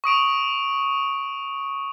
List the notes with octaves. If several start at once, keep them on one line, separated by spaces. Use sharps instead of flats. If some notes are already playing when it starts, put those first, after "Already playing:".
C#6 D#6 D7 F7